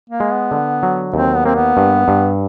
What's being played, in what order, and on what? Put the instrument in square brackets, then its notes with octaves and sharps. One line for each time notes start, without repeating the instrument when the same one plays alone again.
[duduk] A#3
[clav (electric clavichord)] G#3
[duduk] B3
[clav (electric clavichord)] D3
F#3
[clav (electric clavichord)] D#2 [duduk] C4
[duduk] B3
[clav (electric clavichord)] A#3 [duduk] C4
[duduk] B3
[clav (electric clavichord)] G2
G2